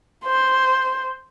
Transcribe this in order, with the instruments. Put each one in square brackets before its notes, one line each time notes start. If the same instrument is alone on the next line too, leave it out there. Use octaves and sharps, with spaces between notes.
[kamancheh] C5